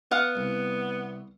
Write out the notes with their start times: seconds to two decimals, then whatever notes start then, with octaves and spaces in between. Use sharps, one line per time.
0.11 B3 F5 F#5
0.35 C2